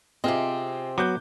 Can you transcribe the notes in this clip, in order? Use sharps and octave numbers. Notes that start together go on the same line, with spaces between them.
C3 C4 F4 G#4 D#5
F#3 B3 D6 F#6 G6